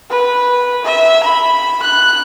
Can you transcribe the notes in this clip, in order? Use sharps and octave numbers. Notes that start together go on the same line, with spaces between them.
B4
E5
B5
F#6